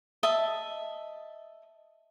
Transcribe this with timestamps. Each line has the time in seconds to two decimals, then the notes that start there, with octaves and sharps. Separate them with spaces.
0.23 D#5 E5 A5